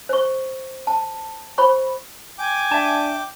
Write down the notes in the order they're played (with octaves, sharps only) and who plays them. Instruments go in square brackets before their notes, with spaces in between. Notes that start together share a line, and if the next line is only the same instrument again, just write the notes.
[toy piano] C5 C#6
A5
C5 B5 C#6
[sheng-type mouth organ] G5 D6 [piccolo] G#5
[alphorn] D4 [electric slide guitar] E5 A5